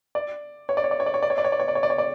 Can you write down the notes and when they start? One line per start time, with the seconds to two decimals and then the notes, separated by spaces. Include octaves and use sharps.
0.15 D5
0.69 C#5
0.77 D5
0.84 C#5
0.91 D5
1.00 C#5
1.06 D5
1.14 C#5
1.23 D5
1.30 C#5
1.38 D5
1.44 C#5
1.52 D5
1.60 C#5
1.68 D5
1.75 C#5
1.83 D5
1.90 C#5
1.98 D5